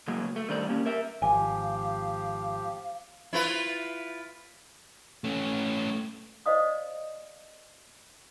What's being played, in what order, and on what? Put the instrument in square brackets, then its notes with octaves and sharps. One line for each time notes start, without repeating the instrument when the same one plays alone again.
[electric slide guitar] C#3 F#3 G#3 A#3
A3
D3 D#3 G3 C5 D5
A#3 C#4 G4
A#4 E5
[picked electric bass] G#1 [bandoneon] F3 G4 [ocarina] F5 [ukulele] G#5
[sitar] E4 F4 B4
[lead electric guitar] A3 C#4
[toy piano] C5 D5 D#5 F5 D#6